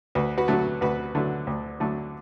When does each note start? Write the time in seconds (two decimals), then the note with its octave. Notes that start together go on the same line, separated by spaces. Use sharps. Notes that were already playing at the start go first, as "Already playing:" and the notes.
0.15 D2 F#4 B4
0.38 F#4 B4
0.48 D3 F#3 A3
0.81 D2 F#4 B4
1.15 D3 F#3 A3
1.47 D2
1.80 D3 F#3 A3